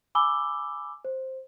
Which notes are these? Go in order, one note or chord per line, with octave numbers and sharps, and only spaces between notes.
G#5 B5 D6 E6 G7
C5